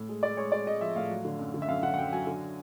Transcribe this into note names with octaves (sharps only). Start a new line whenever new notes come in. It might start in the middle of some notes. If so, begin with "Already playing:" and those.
Already playing: A2
G#3
G#3 D5
G#3 C#5
G#3 D5
G#3 D#5
F3 E5
A2 F5
F#3
D3
F#2
D3
E5
F#2 F5
D3 F#5
F#5
F#2 G5
F#3 G#5
D3